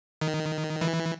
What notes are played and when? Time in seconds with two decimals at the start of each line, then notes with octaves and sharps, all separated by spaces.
0.21 D#3
0.81 E3